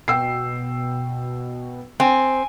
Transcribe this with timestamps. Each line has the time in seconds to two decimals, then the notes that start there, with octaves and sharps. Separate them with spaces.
0.08 B2 G5 E6 C7
2.00 C4 G#5